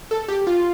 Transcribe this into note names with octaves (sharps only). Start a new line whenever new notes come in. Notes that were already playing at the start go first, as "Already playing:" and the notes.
A4
G4
F4